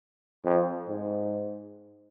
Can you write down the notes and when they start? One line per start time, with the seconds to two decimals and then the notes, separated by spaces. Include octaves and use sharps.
0.44 F2
0.89 G#2